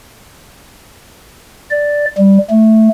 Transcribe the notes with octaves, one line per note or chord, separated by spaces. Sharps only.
D5
G3
A3